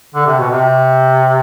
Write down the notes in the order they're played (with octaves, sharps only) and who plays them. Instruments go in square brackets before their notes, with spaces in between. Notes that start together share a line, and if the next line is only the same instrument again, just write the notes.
[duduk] D3
C3
B2
C3